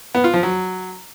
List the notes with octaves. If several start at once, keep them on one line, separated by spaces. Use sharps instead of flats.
B3
F4
F3
F#3